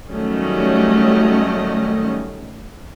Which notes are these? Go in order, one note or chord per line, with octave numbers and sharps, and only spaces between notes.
D#3 F#3 G3 A3 C#4 D#5